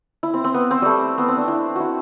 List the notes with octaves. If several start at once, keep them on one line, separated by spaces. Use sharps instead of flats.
E4
C4
C4
B3
C4
G3 A3
B3
C4
D4
E4
E4 F#4